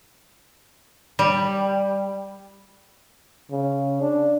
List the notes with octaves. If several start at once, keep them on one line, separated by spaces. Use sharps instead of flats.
G3
C#3
D4